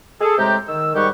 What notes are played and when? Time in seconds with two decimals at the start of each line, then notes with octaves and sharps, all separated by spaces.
0.21 G#4 A4
0.38 A2 C3 G#3 G4 G5 A#5
0.68 D#3 E6
0.95 G#2 D#3 G3 G4 F#5 C#6